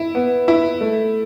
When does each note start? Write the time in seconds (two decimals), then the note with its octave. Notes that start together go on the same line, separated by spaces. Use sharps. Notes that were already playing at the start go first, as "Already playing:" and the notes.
Already playing: E4
0.15 B3
0.48 E4
0.81 A3